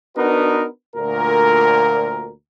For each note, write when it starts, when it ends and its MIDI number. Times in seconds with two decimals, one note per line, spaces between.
0.16 0.66 59
0.16 0.66 62
0.16 0.66 63
0.16 0.66 66
0.16 0.66 70
0.16 0.66 71
0.96 2.30 38
0.96 2.30 46
0.96 2.30 70